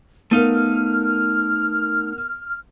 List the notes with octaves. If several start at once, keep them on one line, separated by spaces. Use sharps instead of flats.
A3 B3 D#4 A#4 F5 F6